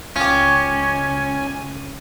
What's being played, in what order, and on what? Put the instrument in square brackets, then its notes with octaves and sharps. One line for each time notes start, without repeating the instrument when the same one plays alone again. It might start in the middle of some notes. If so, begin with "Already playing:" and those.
[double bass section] C#2 [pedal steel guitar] C#4 [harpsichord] F4 G4 [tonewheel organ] G#5